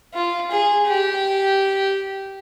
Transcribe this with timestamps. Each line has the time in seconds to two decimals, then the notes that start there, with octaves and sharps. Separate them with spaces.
0.14 F4
0.51 G#4
0.88 G4